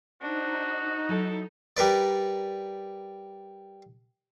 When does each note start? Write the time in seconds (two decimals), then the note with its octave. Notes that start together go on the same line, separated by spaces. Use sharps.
0.22 D4 D#4 F#4 C5
1.09 F#3 E4 A4
1.77 G3 A#4 B4 D5